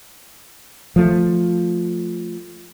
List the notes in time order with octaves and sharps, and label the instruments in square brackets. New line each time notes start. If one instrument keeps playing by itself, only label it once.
[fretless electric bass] F3 A3